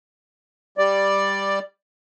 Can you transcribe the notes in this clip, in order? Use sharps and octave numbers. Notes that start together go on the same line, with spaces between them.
G3 D5